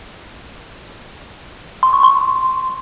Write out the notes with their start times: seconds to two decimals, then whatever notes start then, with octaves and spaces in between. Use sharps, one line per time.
1.83 C6
1.93 C#6
2.03 C6